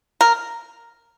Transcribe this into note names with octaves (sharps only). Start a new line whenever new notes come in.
A#4